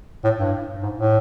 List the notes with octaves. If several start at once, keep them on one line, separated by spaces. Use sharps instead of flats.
A2
G2
G#2
A2